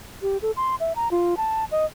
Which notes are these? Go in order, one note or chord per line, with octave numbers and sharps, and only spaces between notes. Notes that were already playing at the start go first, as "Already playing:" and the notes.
G4
A4
C6
E5
A#5
F4
A5
D#5